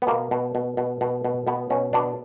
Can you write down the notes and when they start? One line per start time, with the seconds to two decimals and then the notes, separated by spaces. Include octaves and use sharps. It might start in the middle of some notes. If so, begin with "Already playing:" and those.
0.02 B3
0.07 B2 A#3
0.31 B2
0.55 B2
0.77 B2
1.01 B2
1.25 B2
1.47 B2 B3
1.70 B2 C#4
1.93 B2 D4